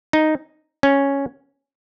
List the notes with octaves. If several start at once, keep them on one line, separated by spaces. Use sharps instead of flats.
D#4
C#4